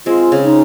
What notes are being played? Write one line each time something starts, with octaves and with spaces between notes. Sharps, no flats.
G#3 C4 F4
C#3
D#4